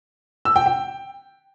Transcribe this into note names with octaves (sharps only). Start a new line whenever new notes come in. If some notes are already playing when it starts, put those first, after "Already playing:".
E6
G5
G5